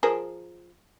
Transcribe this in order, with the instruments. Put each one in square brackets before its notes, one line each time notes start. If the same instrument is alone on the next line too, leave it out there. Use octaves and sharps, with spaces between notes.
[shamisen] F3 G#4 A#4